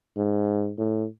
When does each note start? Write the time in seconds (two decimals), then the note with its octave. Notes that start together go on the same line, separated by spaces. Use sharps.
0.17 G#2
0.78 A2